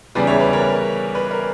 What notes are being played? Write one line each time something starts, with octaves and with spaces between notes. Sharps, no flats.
E2 C#3 E3 G3 B4 D5
C#5 E5
B4 D5
A#4 C#5
B4
A#4